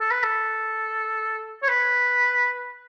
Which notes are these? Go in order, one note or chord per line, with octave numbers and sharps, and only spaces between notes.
A4
B4
A4
C#5
B4